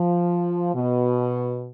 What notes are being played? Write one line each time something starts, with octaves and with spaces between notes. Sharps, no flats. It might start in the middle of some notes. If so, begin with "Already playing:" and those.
Already playing: F3
B2